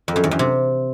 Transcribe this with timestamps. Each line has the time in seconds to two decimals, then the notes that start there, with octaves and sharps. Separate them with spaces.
0.08 F2
0.16 F#2
0.24 E2
0.31 F#2
0.39 C3